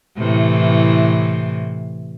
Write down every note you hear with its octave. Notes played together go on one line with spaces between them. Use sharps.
A2 C3 E3